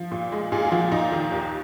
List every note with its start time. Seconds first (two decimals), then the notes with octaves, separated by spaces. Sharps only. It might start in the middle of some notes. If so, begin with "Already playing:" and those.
Already playing: F3
0.12 A#2
0.32 G#3
0.52 A#2 G#4
0.65 F4
0.72 F3 F#4
0.92 A#2 D#4
1.12 D#3
1.32 D#2